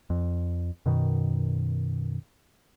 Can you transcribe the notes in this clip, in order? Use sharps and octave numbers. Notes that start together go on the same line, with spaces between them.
F2
F#2 B2 D#3